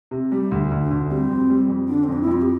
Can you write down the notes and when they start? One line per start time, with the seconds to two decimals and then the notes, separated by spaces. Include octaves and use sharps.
0.11 C3
0.32 G3 G4
0.51 D2
0.71 D2
0.83 D4
0.91 D2
1.09 G3 C4
1.30 F2
1.50 G3
1.68 F2
1.88 D3 D4
2.04 C4
2.09 F2 D4
2.22 E4
2.27 F2 F4
2.42 G4